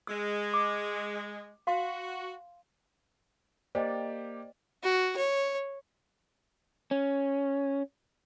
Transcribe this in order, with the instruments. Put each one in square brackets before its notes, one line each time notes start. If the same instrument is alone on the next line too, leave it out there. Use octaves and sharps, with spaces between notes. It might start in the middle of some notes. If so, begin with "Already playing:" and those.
[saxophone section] G#3 [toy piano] E6
[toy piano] D6
[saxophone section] F#4 [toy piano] F5 C6
[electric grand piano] A#3 G4 [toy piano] C5 D#5 G5 [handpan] D5
[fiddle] F#4
C#5
[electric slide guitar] C#4